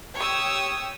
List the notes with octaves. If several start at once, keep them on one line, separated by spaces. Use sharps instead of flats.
G4 C#5 D#6 E6